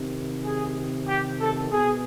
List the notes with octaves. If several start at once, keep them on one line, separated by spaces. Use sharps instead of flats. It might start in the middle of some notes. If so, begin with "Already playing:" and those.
Already playing: C3 D#3
G#4
G4
A4
B2 G#4